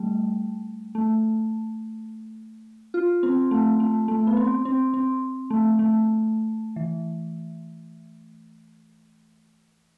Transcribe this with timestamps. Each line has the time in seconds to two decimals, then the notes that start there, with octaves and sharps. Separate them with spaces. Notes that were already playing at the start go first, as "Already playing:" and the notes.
Already playing: G3 A3
0.95 A3
2.94 F4
3.23 C4
3.51 A3
3.80 A3
4.08 A3
4.27 B3
4.37 C4
4.65 C4
4.94 C4
5.50 A3
5.79 A3
6.76 E3